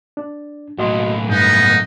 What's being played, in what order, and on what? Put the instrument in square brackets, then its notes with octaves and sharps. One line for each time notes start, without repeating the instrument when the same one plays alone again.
[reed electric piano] D4
[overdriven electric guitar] B1 A2 [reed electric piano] F#4 D#5 C6
[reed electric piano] G2 [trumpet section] B3 D#4